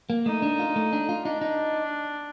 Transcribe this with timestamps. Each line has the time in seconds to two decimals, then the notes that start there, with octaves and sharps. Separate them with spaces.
0.10 A#3
0.26 A3 D#4
0.42 D4
0.59 F4
0.76 A3
0.93 D4
1.09 F4
1.25 D4 D#4
1.41 D#4